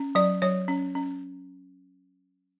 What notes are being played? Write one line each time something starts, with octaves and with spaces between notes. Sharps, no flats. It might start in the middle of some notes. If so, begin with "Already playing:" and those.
Already playing: C#4
F#3 D5
F#3 C#5
C#4
C#4